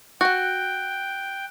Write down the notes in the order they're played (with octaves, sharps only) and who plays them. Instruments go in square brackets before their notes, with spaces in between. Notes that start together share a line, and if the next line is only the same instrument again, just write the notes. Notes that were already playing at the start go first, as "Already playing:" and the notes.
[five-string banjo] F#4 F#5 [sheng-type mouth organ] G5 [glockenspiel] F#6